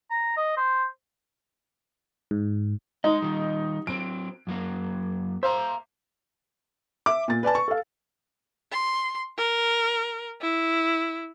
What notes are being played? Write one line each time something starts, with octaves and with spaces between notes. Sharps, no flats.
A#5
D#5
C5
G#2
G#3 D#4 D#5
D#3 G3
F#3 C4 D7
F#2 F#3 A#3
C5 E5 F5 A#5
E5 D6
A#2 A6
B4 D5 G#5 A5
C#6
A4 F5
C6
A#4
E4